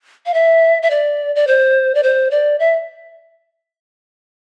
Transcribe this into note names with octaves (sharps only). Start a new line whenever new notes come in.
F5
E5
E5
D5
D5
C5
D5
C5
D5
E5